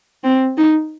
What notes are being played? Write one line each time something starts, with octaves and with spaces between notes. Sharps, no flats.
C4
D#4